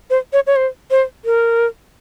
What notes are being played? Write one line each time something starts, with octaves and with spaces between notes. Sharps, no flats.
C5
C#5
C#5
C5
C5
A#4